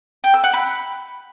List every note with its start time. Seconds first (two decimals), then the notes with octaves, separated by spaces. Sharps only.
0.24 G5
0.34 E6
0.44 F#5
0.54 B5